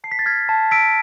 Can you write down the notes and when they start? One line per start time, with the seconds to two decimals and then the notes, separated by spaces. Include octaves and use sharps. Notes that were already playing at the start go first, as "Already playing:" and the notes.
0.04 A5 C7
0.12 B6
0.19 A6
0.26 F6 G#6 B6
0.49 A5
0.71 E6 B6 D7